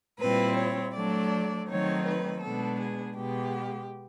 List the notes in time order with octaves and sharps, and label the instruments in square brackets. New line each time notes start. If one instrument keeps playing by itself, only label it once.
[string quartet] A#2 G3 C4 E4 B4
C#5
F#3 A3 D4 D5
D#3 F#3 A3 C4 D#4 C#5
B4
B2 G#3 B3 D4 A4
G#4
B2 G#3 B3 G4